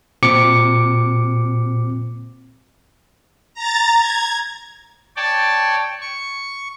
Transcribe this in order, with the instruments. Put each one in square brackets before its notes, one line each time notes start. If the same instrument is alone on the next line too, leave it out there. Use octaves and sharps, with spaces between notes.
[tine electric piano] A#2 C4 D6 C#7
[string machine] A#5 A6
G#6
[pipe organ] C#5 D5 G5 A5
C#6